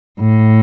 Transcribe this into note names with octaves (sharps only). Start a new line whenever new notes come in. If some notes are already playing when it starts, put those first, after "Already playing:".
A2